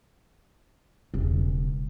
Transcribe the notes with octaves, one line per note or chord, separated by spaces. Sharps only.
E1 C#3